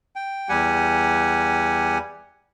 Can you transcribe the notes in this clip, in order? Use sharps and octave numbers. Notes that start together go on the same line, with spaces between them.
G5
E2 G3 G4 F#5 G#5